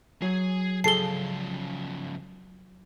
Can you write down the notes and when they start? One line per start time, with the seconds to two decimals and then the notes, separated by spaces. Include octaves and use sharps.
0.22 F#3 G#4 G#5
0.84 C#3 F3 G#4 A4 A5 C7 G7